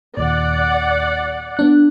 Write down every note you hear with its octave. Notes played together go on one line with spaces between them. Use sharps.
D#2 A#2 D5 F#5
B3 D4 F#6